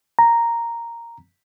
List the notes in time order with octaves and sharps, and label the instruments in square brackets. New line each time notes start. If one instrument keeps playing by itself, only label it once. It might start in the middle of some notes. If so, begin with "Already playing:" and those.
[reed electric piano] A#5